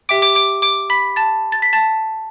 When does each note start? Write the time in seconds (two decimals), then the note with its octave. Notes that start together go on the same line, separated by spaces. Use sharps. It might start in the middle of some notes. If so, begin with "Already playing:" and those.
0.09 G4 E5 G5 D6 D7
0.22 D6 D7
0.35 D6 D7
0.62 D6 D7
0.90 B5 B6
1.16 A5 A6
1.52 A6
1.62 B6
1.73 A5 A6